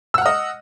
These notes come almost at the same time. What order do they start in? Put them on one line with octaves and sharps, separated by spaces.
E6 F#5 F6 D#5